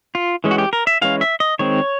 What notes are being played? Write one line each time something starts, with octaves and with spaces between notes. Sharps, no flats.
F4
E3 G#3 C#4
F#4
G4
A#4
E5
E3 G#3 C#4 F5
E5
D#5
D#3 G#3 C4 C#5